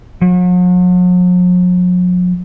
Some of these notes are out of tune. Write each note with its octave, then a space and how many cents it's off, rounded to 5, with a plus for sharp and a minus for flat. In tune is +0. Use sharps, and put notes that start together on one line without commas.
F#3 -45